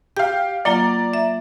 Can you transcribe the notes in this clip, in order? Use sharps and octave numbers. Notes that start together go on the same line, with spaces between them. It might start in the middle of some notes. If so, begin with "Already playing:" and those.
G4 F5 G6
F#3 A#3 F4 D5 A#5
E5